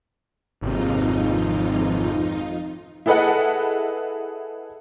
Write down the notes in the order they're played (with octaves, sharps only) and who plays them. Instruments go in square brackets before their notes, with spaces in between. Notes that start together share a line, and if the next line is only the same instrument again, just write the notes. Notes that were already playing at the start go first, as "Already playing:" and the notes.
[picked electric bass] G#1 C3 [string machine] F2 D#4 F4
[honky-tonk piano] E4 G#4 A4 B4 D#5 F#5